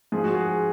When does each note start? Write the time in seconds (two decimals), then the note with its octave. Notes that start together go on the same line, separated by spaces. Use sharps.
0.12 G#2 F3 G#4
0.24 F#4
0.35 G#4